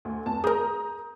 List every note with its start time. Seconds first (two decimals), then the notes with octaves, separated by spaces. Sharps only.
0.05 D2
0.26 F1 A5
0.44 G#4 A#4 A#5 D#6 G6